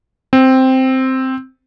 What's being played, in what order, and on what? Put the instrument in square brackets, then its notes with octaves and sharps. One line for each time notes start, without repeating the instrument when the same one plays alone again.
[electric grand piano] C4